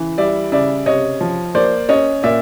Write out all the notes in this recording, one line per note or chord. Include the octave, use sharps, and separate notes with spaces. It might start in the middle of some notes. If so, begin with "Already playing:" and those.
Already playing: C#3 E3
G3 D5 E5
C#3 D5 E5
C3 C#5 D#5
F3
A#3 C5 D5
C#4 C#5 D#5
A#2 D5 E5